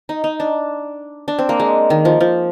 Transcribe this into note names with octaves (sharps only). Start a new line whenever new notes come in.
D#4
D#4
D4
D4
C4
A#3
G#3
D#3
F3
F3